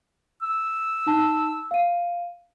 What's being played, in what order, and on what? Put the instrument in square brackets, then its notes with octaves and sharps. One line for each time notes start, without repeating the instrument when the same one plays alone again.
[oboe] E6
[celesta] D#4 A5
F5 D#7